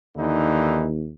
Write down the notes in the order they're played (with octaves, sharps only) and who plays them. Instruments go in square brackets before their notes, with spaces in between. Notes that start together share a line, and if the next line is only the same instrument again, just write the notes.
[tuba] D#2 [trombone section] D3 E3 D#4